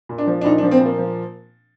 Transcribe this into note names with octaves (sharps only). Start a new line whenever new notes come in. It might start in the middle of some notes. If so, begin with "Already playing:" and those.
A#2
D4
F3
D4
A#2 D#4
D4
F3
C4
A#2 A#3
F3